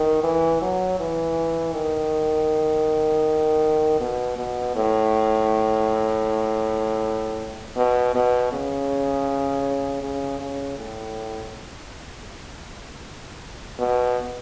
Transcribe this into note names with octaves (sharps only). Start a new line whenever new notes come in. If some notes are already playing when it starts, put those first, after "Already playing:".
Already playing: D#3
E3
F#3
E3
D#3
B2
B2
A2
B2
B2
C#3
C#3
C#3
A2
B2